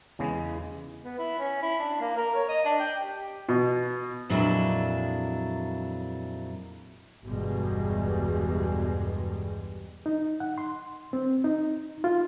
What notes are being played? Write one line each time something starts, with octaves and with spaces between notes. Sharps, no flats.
E2 C#3 G#3 D#5
B3
E4
C#4
E4
D4
A#3
A#4
C#5
D#5
D4
G5
G4
B2
F2 A#2 F#3 G#3 D4 E4
G1 E2 B2 G3 G#3
D#4
F#5
C6
C4
D#4
F4